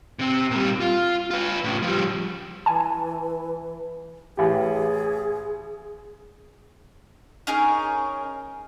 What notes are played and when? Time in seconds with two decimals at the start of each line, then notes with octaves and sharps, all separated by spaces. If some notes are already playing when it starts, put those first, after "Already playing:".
0.19 C3 C4
0.51 A#2 G3
0.80 F4
1.31 F4 B4
1.64 A2 C#3
1.82 F3 G3
2.66 E3 G#5 A5
4.37 A1 G4 G#4
7.47 C#4 D#4 G#4 A#4